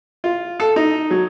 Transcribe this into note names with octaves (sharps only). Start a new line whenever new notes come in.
F4
A4
D#4
F#3